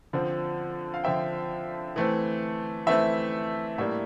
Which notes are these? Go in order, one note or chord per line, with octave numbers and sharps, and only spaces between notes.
D3 F3 C4
F5
D3 F3 C4 E5 G5
E3 A3 C4
E3 A3 C4 E5
A2 G3 A#3 D4 E5